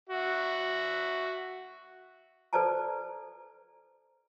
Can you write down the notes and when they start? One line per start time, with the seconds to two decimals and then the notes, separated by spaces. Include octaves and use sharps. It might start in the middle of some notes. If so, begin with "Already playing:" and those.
0.09 F#4 E5
2.53 A4 B4 C5 D5 A5 A#5